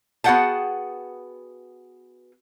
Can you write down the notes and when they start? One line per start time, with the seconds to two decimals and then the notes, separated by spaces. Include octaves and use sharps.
0.24 B3 F#4 G#4 F#5 G5 A5